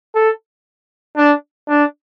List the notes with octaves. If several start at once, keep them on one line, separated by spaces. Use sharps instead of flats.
A4
D4
D4